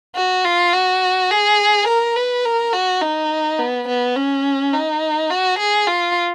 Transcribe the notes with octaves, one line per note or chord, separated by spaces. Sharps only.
F#4
F4
F#4
G#4
A#4
B4
A#4
F#4
D#4
B3
B3
C#4
D#4
F#4
G#4
F4